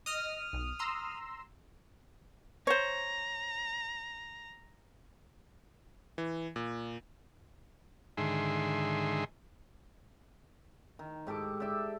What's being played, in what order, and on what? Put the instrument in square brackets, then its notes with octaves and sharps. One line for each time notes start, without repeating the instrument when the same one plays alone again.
[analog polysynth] D#5 [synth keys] D#6 F6
[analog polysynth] B1
A#5 C6 E6
[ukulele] C5 C#5 [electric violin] A#5
[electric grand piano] E3
A#2
[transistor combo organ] G#2 D3 D#3 G#4 E5 C6
[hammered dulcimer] D#3
G#2 G4 A4 D6
G4 D5 E5 G5